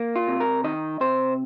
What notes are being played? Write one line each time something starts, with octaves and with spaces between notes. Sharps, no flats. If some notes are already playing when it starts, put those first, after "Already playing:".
Already playing: A#3
F4
C3
A#4
D#3 D#5
C3 C5